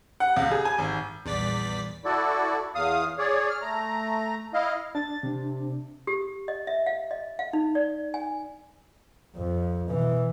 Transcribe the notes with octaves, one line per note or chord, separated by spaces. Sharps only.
F#5
C#2
G#4
G#5
G#1
A#1 E2 G3 D5 B6
E4 F#4 A4 D5
E2 F5 D#6
G#4 C#5 D5
F6
A3 A#5
E4 D#5 F5
D4 A6
C3
G4
D#5
E5
F5
D#5
F5
D#4
D5
G#5
F2
B2 E3